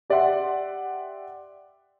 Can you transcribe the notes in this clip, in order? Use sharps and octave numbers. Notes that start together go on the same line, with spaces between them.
G4 D5 E5 F#5 C6